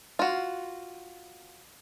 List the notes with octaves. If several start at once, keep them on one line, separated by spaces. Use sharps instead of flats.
F4 F#4